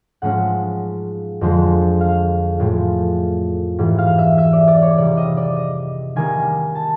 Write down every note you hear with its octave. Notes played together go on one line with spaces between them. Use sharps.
G#2 F3 G#3 C#4 F#5
F2 D3 F3 G#3
F5
A2 F3 G#3
G#2 E3 G3
F5
E5
E5
D5
D5
C#5
C3 D#3 G3 D5
D#5
D5
D#5
D#3 G3 A#3 D#4 G#5
A5